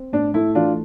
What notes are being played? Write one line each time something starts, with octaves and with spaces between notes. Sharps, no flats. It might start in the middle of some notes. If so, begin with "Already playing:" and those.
Already playing: C4
A2 D4
A3 E4
E3 D4 F4